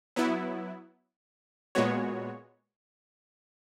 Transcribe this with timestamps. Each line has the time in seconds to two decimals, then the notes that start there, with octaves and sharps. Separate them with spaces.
0.16 F#3 B3 E4
1.75 A#2 G#3 B3 F#4 C#5